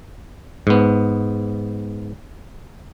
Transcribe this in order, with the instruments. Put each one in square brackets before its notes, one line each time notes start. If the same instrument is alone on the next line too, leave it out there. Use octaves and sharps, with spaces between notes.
[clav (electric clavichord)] G#2 B3